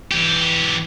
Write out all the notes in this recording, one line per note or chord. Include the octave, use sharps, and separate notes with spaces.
E3 G4